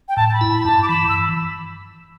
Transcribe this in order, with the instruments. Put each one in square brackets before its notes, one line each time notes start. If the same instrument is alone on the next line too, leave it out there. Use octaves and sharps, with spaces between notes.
[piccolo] G5
[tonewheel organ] A2 [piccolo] A5
[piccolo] A5
B5
[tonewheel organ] E4
[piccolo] B5
[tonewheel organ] G2 [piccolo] A5
[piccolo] D6
[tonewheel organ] E3 [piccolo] B5
[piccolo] E6